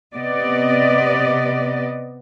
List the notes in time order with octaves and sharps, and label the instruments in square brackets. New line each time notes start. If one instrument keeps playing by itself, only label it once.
[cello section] C3 B3 D5 D#5